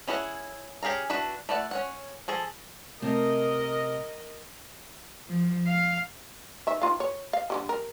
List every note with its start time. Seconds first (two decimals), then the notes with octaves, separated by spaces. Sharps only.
0.08 C#4 E4 G#4 A4 F#5
0.83 C#4 G4 G#4 F5 A#5
1.10 D4 E4 F#4 B4
1.49 A3 E4 D5 F#5
1.71 C#4 C#5 F#5
2.28 F3 G#4 A4
3.02 C3 A3 A#4 D#5
5.28 F3
5.67 F5
6.67 D#3 E5
6.82 D#3 F4 F5
7.00 C#5
7.33 F5
7.50 D3 F#3 G3
7.69 A#4